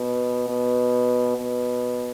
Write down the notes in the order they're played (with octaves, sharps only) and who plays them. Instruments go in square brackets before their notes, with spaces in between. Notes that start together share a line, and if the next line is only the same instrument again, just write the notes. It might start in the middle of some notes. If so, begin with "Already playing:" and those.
Already playing: [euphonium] B2
B2
B2